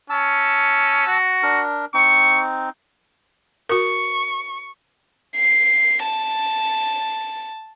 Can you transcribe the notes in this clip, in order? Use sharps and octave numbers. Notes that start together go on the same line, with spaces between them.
C#4 A5 E6
F#4
D4 A#4
C4 D#4 C#6
F#4 A#4 C#6
C7
A5